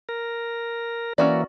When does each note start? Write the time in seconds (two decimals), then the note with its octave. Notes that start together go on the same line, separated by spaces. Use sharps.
0.09 A#4
1.18 E3 A#3 C#4 F#4 D5